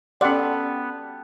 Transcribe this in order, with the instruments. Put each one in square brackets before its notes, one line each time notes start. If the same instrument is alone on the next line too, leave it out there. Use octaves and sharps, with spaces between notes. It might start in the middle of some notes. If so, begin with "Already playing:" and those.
[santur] G3 A4 [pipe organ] B3 [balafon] C#4 C6 [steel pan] D5 F#5